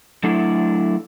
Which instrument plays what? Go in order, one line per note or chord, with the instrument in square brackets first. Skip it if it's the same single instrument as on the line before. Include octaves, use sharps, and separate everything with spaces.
[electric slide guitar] F#3 A3 D4 E4 A4